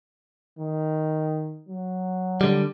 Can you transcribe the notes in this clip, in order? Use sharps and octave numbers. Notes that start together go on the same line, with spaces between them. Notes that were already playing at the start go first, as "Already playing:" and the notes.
D#3
F#3
D3 G3